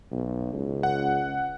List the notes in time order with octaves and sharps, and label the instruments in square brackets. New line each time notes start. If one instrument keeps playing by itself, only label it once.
[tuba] B1
C#2
[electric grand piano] F#5